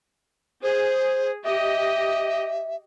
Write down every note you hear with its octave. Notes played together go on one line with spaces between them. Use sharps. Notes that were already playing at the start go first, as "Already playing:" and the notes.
G#4 C5
G4 D#5 E5